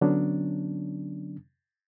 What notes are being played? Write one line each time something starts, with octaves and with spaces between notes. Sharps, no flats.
D3 F#3 B3 C#4 D4